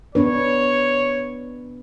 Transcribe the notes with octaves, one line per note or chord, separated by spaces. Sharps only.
B3 D4 B4 C#5